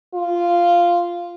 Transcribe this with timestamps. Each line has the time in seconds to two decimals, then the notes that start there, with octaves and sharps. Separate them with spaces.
0.14 F4